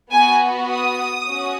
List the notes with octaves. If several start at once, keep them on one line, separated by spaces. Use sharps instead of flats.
B3 F#4 G#5
D#6
C#4 F#4